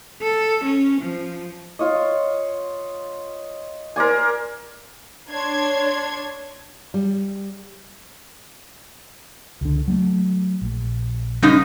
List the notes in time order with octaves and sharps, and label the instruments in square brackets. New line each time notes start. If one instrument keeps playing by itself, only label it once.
[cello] A4
C#4
F3
[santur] F4 C#5 D#5
A#4 C5 D5 G#5
[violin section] D4 C#5 C6 G#6
[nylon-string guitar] G3
[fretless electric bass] C#2 D3
F#3 G#3 A3
A#1
[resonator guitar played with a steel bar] F#2 C#3 D#4 [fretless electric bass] G3